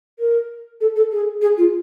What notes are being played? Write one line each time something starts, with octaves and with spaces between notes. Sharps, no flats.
A#4
A4
A4
G#4
G#4
F4